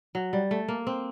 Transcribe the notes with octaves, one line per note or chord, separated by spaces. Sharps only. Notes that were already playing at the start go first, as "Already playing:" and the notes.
F#3
G3
A3
A#3
C4